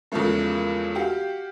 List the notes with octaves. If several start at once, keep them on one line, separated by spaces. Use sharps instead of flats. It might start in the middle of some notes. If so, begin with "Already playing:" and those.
E2 A#2 C#3 F3 G#3 A3
F#4 G4 F5